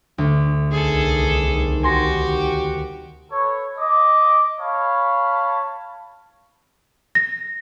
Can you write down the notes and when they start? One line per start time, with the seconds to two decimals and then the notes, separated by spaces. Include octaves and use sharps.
0.18 D2
0.71 C2 D#3 G#4 A4
1.83 F#4 G4 G#5 C6 A#6
3.32 A4 B4 C#5
3.79 D#5 D6
4.60 C#5 F5 A5 B5
7.15 A#6